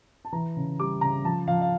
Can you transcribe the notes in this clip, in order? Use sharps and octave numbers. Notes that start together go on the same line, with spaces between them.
A5
E3 A#5
C#3
G3 D6
C#3 A#5
F3 A5
F3 F5
F5